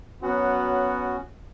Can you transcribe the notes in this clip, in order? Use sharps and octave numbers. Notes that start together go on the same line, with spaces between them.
F#3 B3 C#4 F#4 F#5